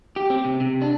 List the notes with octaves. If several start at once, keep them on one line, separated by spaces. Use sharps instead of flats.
G4
C4
C3
C3
D4